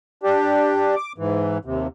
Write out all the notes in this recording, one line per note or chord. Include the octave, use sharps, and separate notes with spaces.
D4 G4
D6
G#2 E3
D#2 C3